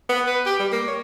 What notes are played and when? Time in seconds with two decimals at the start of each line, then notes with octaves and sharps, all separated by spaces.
0.09 B3
0.27 B4
0.46 G4
0.59 G3
0.72 A#3
0.88 C#5